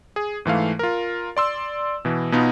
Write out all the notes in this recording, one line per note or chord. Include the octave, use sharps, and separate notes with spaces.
G#4
G#2 E3 A3 F5
F4 A#4
D5 C6 E6
B2 E3
B2 B3 D#4 F4